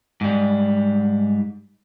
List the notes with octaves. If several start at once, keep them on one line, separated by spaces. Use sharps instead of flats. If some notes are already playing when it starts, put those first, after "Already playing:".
G#2 G3